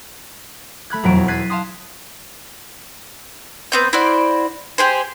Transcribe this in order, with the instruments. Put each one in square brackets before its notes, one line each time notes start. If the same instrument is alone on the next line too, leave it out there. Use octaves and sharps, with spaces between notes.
[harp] A3 B5 F#6 G#6
E1 F2 F#3 A#5 D7
E2
F#6 G#6 A6 B6 C7 D#7
F5 A5 C6 D#6
[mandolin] B3 C4 G6
E4 F#4 C5 D5
G4 G#4 C5